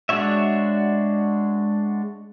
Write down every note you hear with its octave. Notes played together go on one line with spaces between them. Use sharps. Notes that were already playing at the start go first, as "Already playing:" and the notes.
G#3 D4 F#4 C#5 E5